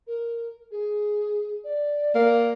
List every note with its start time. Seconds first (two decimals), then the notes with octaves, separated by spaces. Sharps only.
0.07 A#4
0.71 G#4
1.64 D5
2.15 A#3 D5